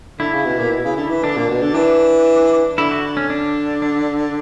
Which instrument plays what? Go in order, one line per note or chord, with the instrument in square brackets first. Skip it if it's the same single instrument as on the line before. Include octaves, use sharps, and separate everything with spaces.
[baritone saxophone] D3 [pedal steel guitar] E4
[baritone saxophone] C#3
B2
A#2
B2
C#3
D3
E3
[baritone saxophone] D3 [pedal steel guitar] D4
[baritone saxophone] A#2
B2
D3
[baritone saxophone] E3 [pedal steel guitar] D4
[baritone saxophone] D3 [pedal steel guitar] E4
[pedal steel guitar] F#4
C#4
D4
D4